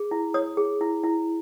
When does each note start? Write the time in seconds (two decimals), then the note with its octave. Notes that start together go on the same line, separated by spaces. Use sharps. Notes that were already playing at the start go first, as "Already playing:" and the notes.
Already playing: G#4
0.11 E4
0.34 C#5 D#6
0.57 G#4
0.81 E4
1.04 E4